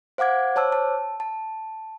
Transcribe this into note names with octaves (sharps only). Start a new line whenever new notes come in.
C5 F5 F#5 D6 G#6
C5 C#5 A5 D6 E6
A5
A5